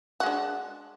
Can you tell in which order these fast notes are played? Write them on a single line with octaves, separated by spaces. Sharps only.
F#4 G#3 D4